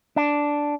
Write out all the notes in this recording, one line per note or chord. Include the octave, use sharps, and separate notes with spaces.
D4